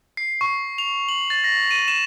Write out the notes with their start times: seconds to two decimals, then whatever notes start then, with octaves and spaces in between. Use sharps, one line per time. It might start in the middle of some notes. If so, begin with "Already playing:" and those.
0.17 C7
0.41 C#6
0.78 F7
1.09 F#7
1.30 A6
1.44 A#6
1.71 D#7
1.88 E7